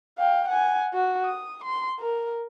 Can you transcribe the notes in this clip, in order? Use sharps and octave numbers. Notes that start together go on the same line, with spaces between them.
F5 G5
F#5 G#5
F#4
D#6
C6
A#4